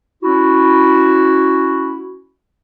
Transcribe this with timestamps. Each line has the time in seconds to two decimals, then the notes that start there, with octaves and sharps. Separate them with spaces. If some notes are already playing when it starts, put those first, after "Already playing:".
0.23 C#4 E4 F#4